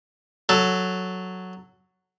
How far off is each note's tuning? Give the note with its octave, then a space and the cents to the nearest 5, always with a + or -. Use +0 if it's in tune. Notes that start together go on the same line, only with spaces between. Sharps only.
F#3 +0 A4 +0